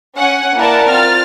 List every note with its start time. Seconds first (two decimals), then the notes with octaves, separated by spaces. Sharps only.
0.18 C#4 F#5 G#5
0.56 A#3 E4 A#4 D5 F#5 A5
0.88 C4 F4 F6 A6